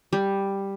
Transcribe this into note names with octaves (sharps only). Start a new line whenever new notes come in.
G3